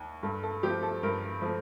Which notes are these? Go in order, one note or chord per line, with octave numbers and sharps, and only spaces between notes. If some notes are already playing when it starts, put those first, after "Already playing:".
Already playing: D#2
G2 A4
A4
F3 A3 C4 G4
A4
G2 A#4
F3 A3 C4